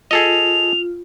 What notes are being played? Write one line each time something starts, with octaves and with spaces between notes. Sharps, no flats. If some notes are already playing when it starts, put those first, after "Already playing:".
F4 G#4 A4 D#5 F7